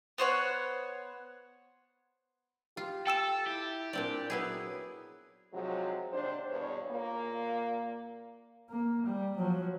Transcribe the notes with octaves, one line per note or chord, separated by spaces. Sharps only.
B3 C5 C#5 F#5
F4 G4
A4 G5 E6 E7
E4 G4
A#2 C4 D4 D5
F#3 B3 E4 G#4
G#2 C3 F3 F#3
D#2 C3 D4 C5
E2 G2 B2 C#5
A#2 A#3
A#3
G3
F3 F#3